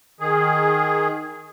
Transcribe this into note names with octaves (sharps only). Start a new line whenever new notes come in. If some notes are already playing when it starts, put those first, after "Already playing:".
D#3 G#4